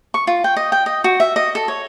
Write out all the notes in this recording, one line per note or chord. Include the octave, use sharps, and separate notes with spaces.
C#6
F4
G5
D#5
G5
D#5
F#4
E5
D#5
A4
C#5